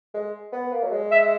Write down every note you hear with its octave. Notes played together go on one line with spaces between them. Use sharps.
G#3
B3
A#3
F#3
G#3
E5